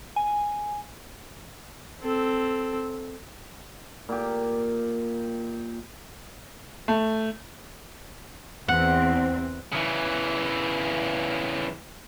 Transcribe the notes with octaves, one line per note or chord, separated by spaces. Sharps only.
G#5
C4 A4
A#2 G4
A3
E2 C4 F#5
C#3 E3